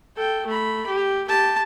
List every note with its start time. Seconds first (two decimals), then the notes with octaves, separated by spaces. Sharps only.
0.16 A4 G5
0.46 A3 B5
0.86 G4
1.28 G4 A5